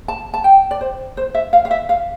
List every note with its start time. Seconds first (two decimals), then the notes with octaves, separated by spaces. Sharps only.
0.08 A5
0.34 A5
0.44 G5
0.71 D5
0.81 C5
1.17 C5
1.35 E5
1.53 F5
1.65 F5
1.71 E5
1.89 F5